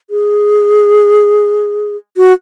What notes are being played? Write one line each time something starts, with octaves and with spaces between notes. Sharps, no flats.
G#4
F#4